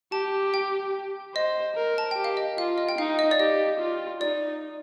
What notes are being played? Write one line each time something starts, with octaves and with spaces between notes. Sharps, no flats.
G4 A5
G5
C5 D#5
A#4
A5
G5
G4
F5
D#5
F4 F5
D#5
G5
D#4 F5
D#5
D5
G4 D#5
F4
D#4 D5